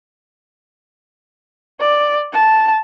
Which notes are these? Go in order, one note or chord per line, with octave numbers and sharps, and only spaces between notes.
D5
A5